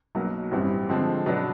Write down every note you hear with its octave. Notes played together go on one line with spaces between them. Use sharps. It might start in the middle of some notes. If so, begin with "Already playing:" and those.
B1 B2 F#3 A#3
A1 G2 E3 G3 C4
D3 F3 G#3 C4
B2 F#3 B3 D4 F#4